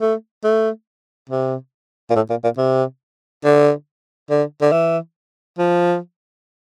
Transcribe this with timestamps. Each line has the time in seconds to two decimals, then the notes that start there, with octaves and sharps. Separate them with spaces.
0.01 A3
0.44 A3
1.29 C3
2.10 A#2
2.16 A2
2.30 A#2
2.44 A#2
2.58 C3
3.44 D3
4.30 D3
4.61 D3
4.72 E3
5.58 F3